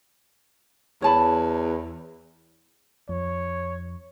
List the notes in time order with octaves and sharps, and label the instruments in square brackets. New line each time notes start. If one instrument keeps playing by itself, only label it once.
[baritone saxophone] E2 [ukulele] C#5 A5 B5
[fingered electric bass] F2 [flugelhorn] C#5